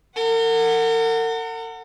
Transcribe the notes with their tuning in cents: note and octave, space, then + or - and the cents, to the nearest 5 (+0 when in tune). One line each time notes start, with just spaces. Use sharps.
A#4 -45 F#5 +0